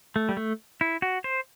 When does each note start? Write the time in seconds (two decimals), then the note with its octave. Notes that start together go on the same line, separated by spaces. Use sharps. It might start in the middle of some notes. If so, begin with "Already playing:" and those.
0.16 A3
0.29 G3
0.37 A3
0.81 E4
1.02 F#4
1.24 C5